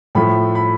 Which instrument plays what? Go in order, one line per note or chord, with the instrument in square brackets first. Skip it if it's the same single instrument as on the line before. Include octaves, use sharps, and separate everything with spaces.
[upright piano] A2 F3 A3 B5
B5